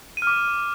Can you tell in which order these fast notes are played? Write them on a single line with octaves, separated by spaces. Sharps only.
D#7 F6 D6